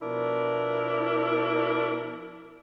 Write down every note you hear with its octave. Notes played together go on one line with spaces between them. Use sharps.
B2 F3 D4 E4 A#4